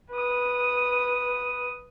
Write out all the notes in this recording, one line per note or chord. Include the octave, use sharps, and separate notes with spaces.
B4 D#6